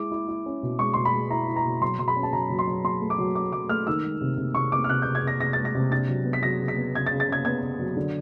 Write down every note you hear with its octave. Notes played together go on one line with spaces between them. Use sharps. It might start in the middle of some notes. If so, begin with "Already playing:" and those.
Already playing: G#3 E4 D6
E4
E4
C#4
B2
G#3 C#6
B2 C6
B5
G#3
E4 A#5
E4
A#5
B2
F#3 C6
F#3 C6
B5
C#4
A5
F#3 A#5
F#3
C6
F#3
F#3 C6
A3
D6
F#3
A3 D6
F#3 D6
A3 F6
D#3 E6
G#3
C3
C3
C3 C#6
C3 D6
F6
C3 F#6
C3 G6
G#6
C3 A#6
C3 A#6
G#3 A6
A#6
C3
D4 A6
F#3
B3
B6
F#3 A#6
C#3
B6
B3
C#3 G#6
A6
C#3
A6
C#3 G#6
B3 G#6
C#3
F#3
D3